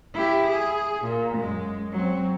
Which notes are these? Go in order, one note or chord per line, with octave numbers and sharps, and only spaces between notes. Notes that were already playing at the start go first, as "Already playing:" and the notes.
E4 G4
G#4
A#2
F#2 G#3
F#3 C4